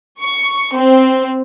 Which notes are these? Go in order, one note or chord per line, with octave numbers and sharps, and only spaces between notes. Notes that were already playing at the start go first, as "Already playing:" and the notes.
C#6
C4